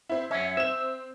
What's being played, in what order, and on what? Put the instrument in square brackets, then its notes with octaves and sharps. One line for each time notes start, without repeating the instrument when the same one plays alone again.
[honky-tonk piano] C4 E4
[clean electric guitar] F#2 C#4 [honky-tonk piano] E5
[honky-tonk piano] C4 E7 [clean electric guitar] E5